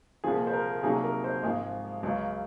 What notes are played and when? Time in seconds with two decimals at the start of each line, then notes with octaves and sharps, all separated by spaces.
0.24 C2 A#2 F3 G#4
0.47 C5
0.53 A#4
0.83 C2 C3 F#3 A#3 D#4 G#4
1.04 A#4
1.24 C5
1.43 G#1 G#2 F3 G#3 G#4
2.03 C#2 C#3 F#3